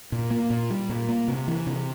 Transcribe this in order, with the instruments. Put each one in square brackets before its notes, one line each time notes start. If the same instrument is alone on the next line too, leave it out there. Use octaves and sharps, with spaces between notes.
[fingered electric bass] A#2
A#3
A#2
G3
A#2
A#3
C3
E3
C3